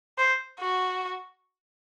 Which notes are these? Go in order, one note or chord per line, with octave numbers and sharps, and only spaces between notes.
C5
F#4